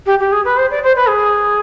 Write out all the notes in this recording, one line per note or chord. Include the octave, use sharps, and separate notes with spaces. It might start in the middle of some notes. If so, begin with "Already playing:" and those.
G4
G4
G#4
B4
C5
D5
C5
B4
G#4